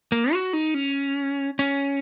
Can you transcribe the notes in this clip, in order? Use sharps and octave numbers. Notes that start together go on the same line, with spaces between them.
A#3
F#4
D#4
C#4
C#4